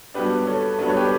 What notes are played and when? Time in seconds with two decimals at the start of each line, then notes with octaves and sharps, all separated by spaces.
0.14 G2 F#3 B3 D4 G4 B4
0.47 A4 C#5
0.79 G2 F#3 B3 D4 B4
0.88 C#5
0.97 G4 B4